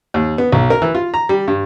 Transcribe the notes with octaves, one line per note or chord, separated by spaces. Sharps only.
D#2
B3
B1
A#4
E3
F4
A#5
G3
G2